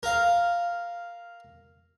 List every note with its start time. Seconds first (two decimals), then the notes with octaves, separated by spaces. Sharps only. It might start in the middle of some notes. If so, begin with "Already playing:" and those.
0.03 A#4 F5